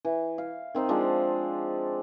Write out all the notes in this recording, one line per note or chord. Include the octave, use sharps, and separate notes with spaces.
E3
F5
D#3 C4 D#4
F3 G#3 D4